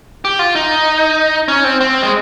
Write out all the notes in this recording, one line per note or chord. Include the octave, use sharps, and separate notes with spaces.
G4
F4
D#4
C#4
C4
C4
G#3